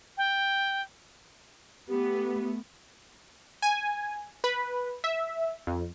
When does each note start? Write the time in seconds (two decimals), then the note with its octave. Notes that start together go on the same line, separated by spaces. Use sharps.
0.17 G5
1.88 A3 B3 G4
3.62 G#5
4.44 B4
5.04 E5
5.67 F2